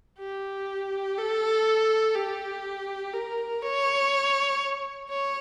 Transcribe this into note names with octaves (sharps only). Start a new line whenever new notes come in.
G4
A4
G4
A#4
C#5
C#5